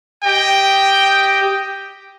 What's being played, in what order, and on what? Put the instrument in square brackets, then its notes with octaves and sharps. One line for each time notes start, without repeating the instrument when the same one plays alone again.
[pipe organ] G4 D#5 [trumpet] G5